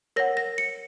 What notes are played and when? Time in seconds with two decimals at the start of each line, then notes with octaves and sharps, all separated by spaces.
0.16 A#4 C#5 F#5 A#6
0.37 A#6
0.58 C#7